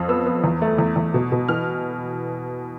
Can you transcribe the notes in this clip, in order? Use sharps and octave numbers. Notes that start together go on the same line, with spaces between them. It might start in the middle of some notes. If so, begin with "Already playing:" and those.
Already playing: F2
B3 E6
B3
E2
A3
E2
E2
B2
B2
E3 F6